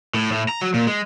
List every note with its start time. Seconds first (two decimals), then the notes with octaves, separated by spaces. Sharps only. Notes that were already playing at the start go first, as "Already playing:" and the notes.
0.14 A2
0.32 A2
0.49 A#5
0.61 F#3
0.74 A#2
0.87 G#3